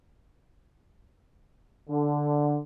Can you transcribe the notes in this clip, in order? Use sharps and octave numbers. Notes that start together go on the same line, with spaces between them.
D3